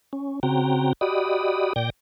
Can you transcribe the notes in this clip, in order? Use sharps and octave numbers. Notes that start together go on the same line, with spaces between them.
C#4
C#3 C4 F#4 G5 A#5
F#4 G4 D5 D#5 B5 D#6
A#2 D5 G5 G6 A#6